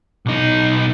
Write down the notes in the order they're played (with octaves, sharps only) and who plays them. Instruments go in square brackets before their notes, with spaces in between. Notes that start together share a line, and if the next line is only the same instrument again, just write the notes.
[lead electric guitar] B1 D#4